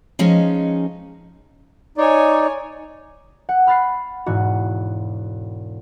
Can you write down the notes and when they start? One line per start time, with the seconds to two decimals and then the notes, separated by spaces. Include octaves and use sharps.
0.19 F3 G#3 C#4 D#4
1.98 D#4 C#5 D5 G#5
3.49 F#5
3.67 B5 F6 F#6 A6 B6 C7
4.26 E1 G#2 F#4